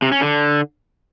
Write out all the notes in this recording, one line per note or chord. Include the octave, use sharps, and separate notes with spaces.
C3
C#4
D3